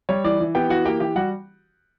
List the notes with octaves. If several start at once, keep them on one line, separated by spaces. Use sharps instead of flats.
G3 C#5
E3 D5
E3
B3 G4 G5
E3 F#4 F#5
A#3 G4 G5
E3 G4 G5
G3 F#4 F#5